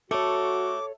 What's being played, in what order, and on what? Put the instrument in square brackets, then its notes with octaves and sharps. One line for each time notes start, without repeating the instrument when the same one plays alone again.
[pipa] A3 [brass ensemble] F#4 [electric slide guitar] A4 C#5 [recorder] D6